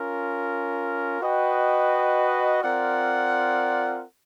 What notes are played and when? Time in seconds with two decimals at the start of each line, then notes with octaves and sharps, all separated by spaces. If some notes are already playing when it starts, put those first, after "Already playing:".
Already playing: C#4 F4 A#4
1.21 F#4 B4 D#5 G5
2.63 C4 F4 A#4 D5 F#5